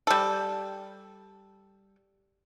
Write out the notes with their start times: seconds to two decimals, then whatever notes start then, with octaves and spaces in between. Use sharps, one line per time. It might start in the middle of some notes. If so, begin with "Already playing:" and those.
0.07 G3 A4